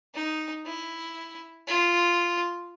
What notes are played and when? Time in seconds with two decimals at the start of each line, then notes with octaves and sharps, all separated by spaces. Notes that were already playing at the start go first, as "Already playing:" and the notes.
0.14 D#4
0.66 E4
1.68 F4